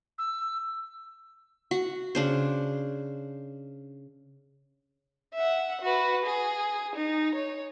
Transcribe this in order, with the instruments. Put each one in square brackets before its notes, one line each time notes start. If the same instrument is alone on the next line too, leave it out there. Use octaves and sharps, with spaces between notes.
[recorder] E6
[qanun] F#4
C#3 D4 C5
[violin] E5 F#5
F#4 B4
G#4
D#4
C#5